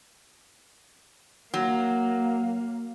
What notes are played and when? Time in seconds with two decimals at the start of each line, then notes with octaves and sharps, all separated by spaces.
1.54 F#3 A#3